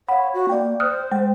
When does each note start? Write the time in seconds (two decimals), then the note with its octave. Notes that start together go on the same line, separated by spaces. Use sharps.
0.09 C#5 F5 F#5 B5
0.34 F#4
0.49 A#3 D5 G5
0.80 C5 D#6 F6 F#6
1.11 G#3 G5